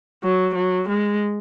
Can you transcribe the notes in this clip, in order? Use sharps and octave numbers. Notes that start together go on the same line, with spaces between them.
F#3
F#3
G#3